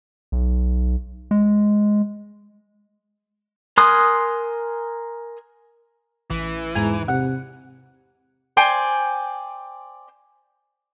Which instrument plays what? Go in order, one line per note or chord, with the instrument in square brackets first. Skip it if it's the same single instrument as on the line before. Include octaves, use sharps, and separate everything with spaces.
[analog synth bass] B1
G#3
[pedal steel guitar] A#4 G#5 C6 D#6 F#6
[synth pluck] A1 B6 [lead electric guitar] E3
[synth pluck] E2 G#2 A#5 [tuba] G#3 [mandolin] G#5
[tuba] C3 [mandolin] F#5
[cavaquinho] C5 D5 G5 G#5